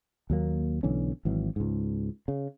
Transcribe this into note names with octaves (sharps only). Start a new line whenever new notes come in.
D#2 F#3 A#3
B1 D3 E3 C#4
G#1 E3 F#3
C#2 G#2
C#3